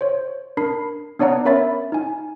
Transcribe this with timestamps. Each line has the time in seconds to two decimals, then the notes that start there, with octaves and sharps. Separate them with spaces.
0.01 C5 C#5
0.57 D4 A#4 B5 C7
1.19 B3 D4 C#5 D5 F#5 A#5
1.45 C#4 A#4 C#5 E5 B5 A6
1.92 D#4 G#5